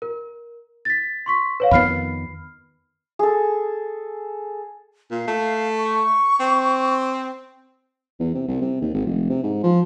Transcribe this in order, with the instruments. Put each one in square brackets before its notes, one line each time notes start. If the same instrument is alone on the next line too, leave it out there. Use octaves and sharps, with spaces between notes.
[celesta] A#4
A6 B6
C6 C#6 B6
B4 C#5 F5
[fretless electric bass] F2 D#3 B3 [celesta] B5 F6 C7
[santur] G#4 A4
[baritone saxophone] A#2 [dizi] F5
[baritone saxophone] A3
[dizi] C#6
[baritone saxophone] C4
[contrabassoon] E2
C3
C2
C3
D#2
G#1
F1
C3
G#2
F3